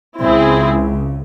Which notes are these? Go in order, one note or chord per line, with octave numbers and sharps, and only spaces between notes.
C#2 C#3 C4 E4 G#4